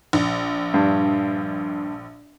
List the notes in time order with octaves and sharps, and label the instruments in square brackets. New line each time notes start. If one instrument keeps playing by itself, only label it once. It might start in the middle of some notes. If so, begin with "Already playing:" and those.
[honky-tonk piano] A#1
[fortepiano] G2